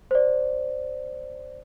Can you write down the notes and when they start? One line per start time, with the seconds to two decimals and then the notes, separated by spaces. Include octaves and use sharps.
0.11 C5 D5